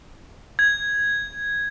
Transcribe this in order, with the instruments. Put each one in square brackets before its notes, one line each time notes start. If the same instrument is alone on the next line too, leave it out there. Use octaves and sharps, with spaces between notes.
[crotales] G#6